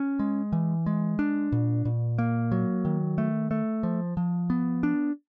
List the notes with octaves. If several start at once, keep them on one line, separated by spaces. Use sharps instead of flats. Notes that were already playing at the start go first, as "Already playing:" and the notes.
Already playing: C#4
G#3
E3
G#3
D4
A#2
A#2
A#3
F#3
D#3
A3
A3
F3
F3
B3
D4